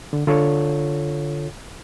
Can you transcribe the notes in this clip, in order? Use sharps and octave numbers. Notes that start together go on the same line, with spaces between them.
D3
D3 F4 A4 C#5